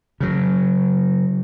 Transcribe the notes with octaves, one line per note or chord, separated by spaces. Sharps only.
C#3 F#3